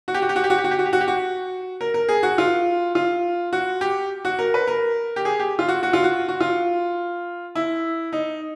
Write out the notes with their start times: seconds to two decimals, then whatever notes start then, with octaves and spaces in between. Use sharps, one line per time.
0.08 F#4
0.14 G4
0.22 F#4
0.29 G4
0.36 F#4
0.44 G4
0.50 F#4
0.58 G4
0.64 F#4
0.71 G4
0.79 F#4
0.86 G4
0.93 F#4
1.01 G4
1.08 F#4
1.81 A#4
1.94 A#4
2.09 G#4
2.23 F#4
2.38 F4
2.95 F4
3.53 F#4
3.81 G4
4.25 F#4
4.39 A#4
4.54 B4
4.67 A#4
5.16 G4
5.25 G#4
5.40 G4
5.59 F4
5.68 F#4
5.83 F#4
5.93 F4
6.04 F#4
6.28 F#4
6.41 F4
7.55 E4
8.13 D#4